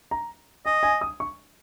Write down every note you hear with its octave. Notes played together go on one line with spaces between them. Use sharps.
A#5
D#5 G#5
G#5
D#6
C#6